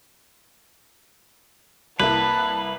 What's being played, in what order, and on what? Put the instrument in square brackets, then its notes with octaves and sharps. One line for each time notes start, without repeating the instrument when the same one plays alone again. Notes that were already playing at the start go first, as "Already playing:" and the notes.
[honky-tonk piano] C2 A#3 E4 [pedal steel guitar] B4 [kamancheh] A5 [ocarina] B5